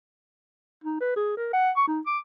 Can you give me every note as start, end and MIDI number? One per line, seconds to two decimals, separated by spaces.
0.84 0.98 63
1.00 1.13 71
1.16 1.35 68
1.37 1.52 70
1.53 1.71 78
1.76 1.83 85
1.87 2.00 63
2.07 2.18 86